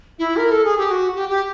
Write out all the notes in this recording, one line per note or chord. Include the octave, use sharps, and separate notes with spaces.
E4
A#4
A4
G#4
G4
F#4
G4
G4